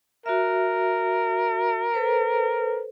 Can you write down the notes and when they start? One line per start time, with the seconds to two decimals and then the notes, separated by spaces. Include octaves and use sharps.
0.26 F#4 A#4 E5
1.94 A4 B4 C5